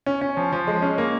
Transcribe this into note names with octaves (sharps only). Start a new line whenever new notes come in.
C#4
C#4
F3
F3
G#3
C#4
A#3